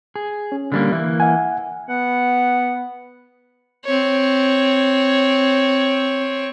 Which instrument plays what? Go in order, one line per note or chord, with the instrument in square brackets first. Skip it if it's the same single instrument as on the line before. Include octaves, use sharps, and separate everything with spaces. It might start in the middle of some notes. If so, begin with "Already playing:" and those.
[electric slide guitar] G#4
[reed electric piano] C#4
[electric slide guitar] D3 G3 A#3
[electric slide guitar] E3 A#3 [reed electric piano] E5
[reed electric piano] E5 F#5 G#5
[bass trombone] B3 [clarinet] F#5
[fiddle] C4 C#5